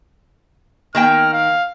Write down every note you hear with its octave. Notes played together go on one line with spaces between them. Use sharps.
D#3 A#3 G5 F6
F5